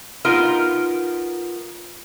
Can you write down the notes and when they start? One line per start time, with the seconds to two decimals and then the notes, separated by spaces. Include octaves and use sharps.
0.25 B3 D#4 F4 A#4